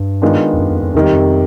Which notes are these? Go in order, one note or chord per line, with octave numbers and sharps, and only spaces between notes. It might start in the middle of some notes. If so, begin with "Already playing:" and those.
Already playing: G2
D#3 G#3 B3 D4 F4
F2
F#2
F2
F2
E2 C3 D#3 G3
F2